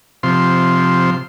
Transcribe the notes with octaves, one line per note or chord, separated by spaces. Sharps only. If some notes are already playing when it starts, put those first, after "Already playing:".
C3 F3 C6